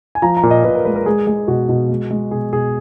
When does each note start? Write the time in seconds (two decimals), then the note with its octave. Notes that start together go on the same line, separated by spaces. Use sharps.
0.15 G#5
0.22 F3 A#5
0.37 A#5
0.43 A#2
0.51 D#5
0.64 A#2 B4
0.75 A#4
0.85 G#3 B4
0.96 A#4
1.06 G#3 G#4
1.27 G#3 G#4
1.48 B2 F#4
1.69 B2
1.89 G#3
2.11 G#3
2.31 B2 G#4
2.53 B2 G#4